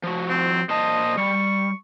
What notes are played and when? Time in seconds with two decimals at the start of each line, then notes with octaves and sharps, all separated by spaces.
0.03 F3 F#4
0.29 C4
0.70 A#2 C5 D#5 A5
1.17 G3 C#6